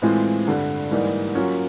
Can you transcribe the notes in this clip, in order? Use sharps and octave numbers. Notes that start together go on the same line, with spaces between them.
A2 E3 G#3 C4 F4
G2 D3 G3
G#2 E3 G3 A#3 D#4
F#3 A#3 C#4 F4 A#4